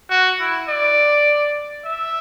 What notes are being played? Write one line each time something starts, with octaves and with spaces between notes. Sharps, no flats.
F#4
E4
D5
E5